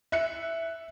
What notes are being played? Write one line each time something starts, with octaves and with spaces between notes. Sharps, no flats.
E5 F#6 C#7